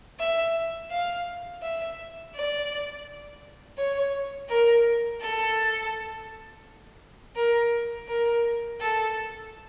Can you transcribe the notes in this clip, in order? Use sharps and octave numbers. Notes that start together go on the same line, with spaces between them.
E5
F5
E5
D5
C#5
A#4
A4
A#4
A#4
A4